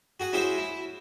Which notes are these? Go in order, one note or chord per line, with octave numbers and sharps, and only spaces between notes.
F#4 G#4 F#5
C#4 E4 F#4 G#4 C5 E5
E4